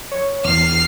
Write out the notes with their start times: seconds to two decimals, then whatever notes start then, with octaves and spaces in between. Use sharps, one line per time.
0.12 C#5
0.45 E2 F6 C7